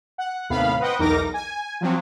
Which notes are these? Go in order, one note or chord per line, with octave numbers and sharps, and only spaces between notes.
F#5
D#2 A2 C3 B3 F5 B5
B4 C5 D#5 F#5 G5
B1 E2 D#4 A#4 D6 A#6
G#5
F3 F#3 C4